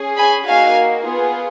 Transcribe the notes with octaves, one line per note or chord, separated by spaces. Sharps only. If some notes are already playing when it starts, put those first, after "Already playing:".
Already playing: C#4 G#4
G#5 B5
A#3 D#4 F#4 F5 G#5
B3 F4 G#4